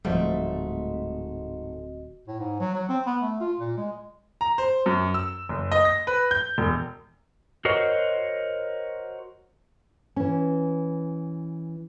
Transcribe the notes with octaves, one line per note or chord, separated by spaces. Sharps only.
D1 G#2 F3 G3 A3 C4 F#4 D#5
A2
G#2
F#3
F#3
C4
B3
A3
F4
A#2
G#3
A#5
C5
F#2
E6
F#1
D#5
A#6
B4
G6
E1
F#4 A#4 C5 C#5 D#5
E3 C#4